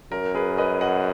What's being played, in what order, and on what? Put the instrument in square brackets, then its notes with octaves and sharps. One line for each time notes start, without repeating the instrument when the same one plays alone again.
[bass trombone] F#2 [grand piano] A#4
[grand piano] G#4 B4
B4 D#5
D#5 F#5